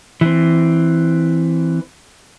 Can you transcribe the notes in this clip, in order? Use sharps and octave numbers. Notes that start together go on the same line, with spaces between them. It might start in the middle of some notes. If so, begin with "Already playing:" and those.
E3 C4